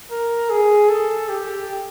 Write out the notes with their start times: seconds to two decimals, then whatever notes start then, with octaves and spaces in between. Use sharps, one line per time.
0.11 A#4
0.50 G#4
0.89 A4
1.29 G4